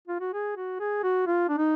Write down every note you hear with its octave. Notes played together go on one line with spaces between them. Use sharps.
F4
F#4
G#4
F#4
G#4
F#4
F4
D4
D#4